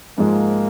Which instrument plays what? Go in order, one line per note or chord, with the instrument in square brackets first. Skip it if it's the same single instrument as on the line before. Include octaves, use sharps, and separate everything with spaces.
[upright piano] G#2 F3 G#3 [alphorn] A#3